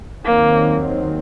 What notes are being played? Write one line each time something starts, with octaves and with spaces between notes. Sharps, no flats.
D#2 D#3 F#3 A#3 C4